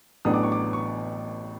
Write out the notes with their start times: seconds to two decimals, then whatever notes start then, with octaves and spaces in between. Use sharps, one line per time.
0.25 A1 A2 F#3 B3 D4 D#6
0.34 D6
0.43 C#6
0.52 D6
0.73 C#6